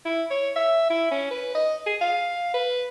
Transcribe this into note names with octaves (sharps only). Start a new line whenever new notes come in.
E4
C#5
E5
E4
C#4
B4
D#5
G#4
F5
B4